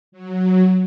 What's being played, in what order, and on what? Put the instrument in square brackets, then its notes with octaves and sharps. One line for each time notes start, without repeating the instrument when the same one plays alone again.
[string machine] F#3